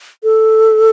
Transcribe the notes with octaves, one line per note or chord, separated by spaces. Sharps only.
A4